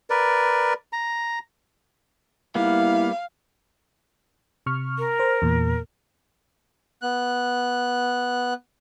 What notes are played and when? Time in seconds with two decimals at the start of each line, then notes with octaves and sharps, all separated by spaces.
0.10 A#4 B4 D5
0.93 A#5
2.55 G3 A#3 B3 E4 F5
4.66 C3 C#6 F6
4.98 A#4
5.19 C5
5.42 E2 A#2
7.02 B3 F#6